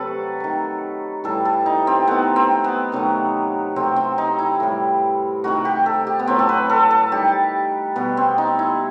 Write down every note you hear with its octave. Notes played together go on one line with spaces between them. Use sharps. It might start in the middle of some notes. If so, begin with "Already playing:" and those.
Already playing: C3 F#3 A3 A4 B4
D#3 A3
A2 E3 G3 A4
A4
D#4
C4
D#3 A3 B3
C4
B3
C3 D#3 F#3 A3
C3 F#3 A3 C4
C4
D#4
E4
A2 E3 G3
C3 D#3 A3 F#4
G4
A4
G4
B3
A2 F#3 A3 C4
A4
B4
A4
A4
D#3 G3 G4
B2 G3 B3
C4
D#4
E4